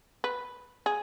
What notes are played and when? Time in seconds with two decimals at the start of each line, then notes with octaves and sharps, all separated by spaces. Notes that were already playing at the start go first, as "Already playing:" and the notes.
0.24 B4
0.86 G#4